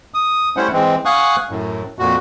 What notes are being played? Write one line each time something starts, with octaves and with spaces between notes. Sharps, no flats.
D#6
G3 A3 C#4 E4 C5 F#5
E3 G#3 C4
F5 F#5 G#5 C#6 D#6 F#6
F#2 A2
F2 A#2 F#4